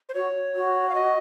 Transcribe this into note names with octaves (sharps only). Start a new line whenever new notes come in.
C5
F#4 C#5
F#4
F5
D#5